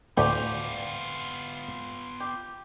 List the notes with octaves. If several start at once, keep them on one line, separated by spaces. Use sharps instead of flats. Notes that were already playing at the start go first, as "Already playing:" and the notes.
D2 A2 B3 F4 G4
G4